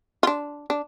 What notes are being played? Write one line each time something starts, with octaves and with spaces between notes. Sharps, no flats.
F4
D4
D4